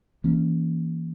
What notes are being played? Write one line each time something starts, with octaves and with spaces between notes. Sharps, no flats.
E3 A#3 C#4